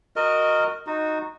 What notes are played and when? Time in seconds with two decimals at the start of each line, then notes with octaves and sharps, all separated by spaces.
0.16 F#4 A#4 D#5
0.87 D#4 F#4